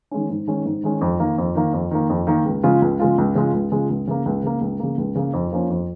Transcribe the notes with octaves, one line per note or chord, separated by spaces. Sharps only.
D#3 G#3 C#4
G#2
D#3 G#3 C#4
G#2
D#3 G#3 C#4
F2
D#3 A#3
F2
D#3 A#3
F2
D#3 A#3
F2
D#3 A#3
C#2
C#3 G#3 F4
C#2
C#3 G#3 F4
C#2
C#3 G#3 F4
C#2
C#3 G#3 F4
C#2
C#3 A#3
C#2
C#3 A#3
C#2
C#3 A#3
C#2
C#3 A#3
F2
F3 A#3 C#4
F2